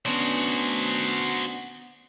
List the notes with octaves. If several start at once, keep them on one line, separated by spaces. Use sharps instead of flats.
B3 C#4 D4 F#4 C5